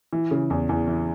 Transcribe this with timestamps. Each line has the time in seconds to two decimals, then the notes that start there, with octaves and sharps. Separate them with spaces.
0.13 E3
0.31 C#3
0.50 E2
0.69 E2
0.87 E3